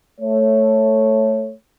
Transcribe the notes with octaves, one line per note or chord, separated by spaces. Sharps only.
A3 C#5